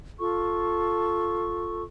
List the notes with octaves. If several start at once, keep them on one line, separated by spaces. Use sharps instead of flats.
F4 A4 C#6